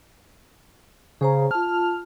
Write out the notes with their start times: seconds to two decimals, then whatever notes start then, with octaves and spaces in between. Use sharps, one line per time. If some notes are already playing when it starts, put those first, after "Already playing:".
1.21 C#3 G#4 C5 A#5
1.51 F4 A5 F6